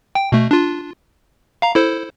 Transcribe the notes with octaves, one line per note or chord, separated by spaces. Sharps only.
G5
B2 A3
D4 F4
F5 A#5
E4 A4 C5